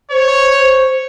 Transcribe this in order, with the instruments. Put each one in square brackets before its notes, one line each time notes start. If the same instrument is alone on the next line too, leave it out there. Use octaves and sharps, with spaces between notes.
[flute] C5 [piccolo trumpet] C#5